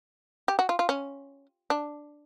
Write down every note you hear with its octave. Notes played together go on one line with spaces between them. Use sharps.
G4
F#4
F4
F4
C#4
D4